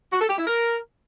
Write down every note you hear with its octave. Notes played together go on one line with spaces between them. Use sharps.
F#4
A4
G4
E4
A#4